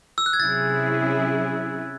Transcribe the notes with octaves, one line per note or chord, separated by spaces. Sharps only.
E6
F#6
G#6
C3 F#3 C#4 E4 G#4 A6